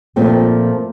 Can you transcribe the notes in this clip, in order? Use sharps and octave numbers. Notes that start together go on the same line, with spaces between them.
A#2 F3 A3 C4